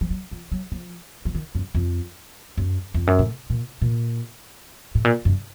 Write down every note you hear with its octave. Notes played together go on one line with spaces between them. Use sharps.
F3
F#3
F3
F#3
F3
F3
D#3
F#2
F2
F#2
F2
F#2
A2
A#2
A#2
A2
A#2
F#2